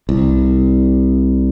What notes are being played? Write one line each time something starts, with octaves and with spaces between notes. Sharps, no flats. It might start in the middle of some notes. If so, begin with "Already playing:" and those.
C2